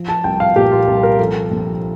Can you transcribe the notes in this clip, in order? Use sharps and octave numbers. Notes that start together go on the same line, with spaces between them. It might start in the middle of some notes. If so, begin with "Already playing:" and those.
Already playing: F3
A5
C2 G5
F5
A#2 G4
F4
C2
A#4
F3 A4
A#1